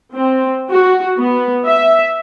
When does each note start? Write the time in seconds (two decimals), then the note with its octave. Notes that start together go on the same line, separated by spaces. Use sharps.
0.14 C4
0.71 F#4
1.19 B3
1.65 E5